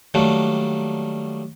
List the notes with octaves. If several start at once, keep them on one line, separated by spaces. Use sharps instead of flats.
D#3 F#3 G3 A3 A#3 D4